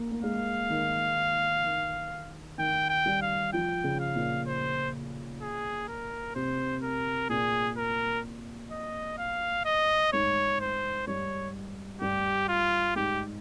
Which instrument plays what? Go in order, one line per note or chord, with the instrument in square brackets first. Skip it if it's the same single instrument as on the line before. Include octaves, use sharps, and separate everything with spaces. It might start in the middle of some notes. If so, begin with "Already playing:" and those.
Already playing: [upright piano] A#3
A#3
[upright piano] G#3 [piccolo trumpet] F5
[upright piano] D#3
D#3
[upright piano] D#3 [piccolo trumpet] G5
[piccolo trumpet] G5
[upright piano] G3
[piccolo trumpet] F5
[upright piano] F3 [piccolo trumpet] G5
[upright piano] C#3
[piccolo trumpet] F5
[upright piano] A#2
[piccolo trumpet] C5
G#4
A#4
[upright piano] C3 [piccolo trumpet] C5
[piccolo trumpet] A#4
[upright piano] A#2 [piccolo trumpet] G#4
[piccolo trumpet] A#4
D#5
F5
D#5
[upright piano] G#2 [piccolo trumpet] C#5
[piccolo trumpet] C5
[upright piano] G2 [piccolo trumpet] C#5
[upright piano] G2 [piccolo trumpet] G4
[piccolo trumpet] F4
[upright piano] G#2 [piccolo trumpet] G4